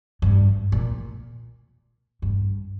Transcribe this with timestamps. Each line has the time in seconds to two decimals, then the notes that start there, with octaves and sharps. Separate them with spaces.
0.22 G2
0.72 A#2
2.22 G2